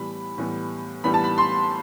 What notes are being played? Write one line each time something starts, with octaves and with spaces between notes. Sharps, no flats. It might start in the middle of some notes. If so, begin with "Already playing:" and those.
Already playing: A2 E3 G3 B3 B5
A2 E3 G3 B3
A2 E3 G3 B3 B5
A5
B5
C6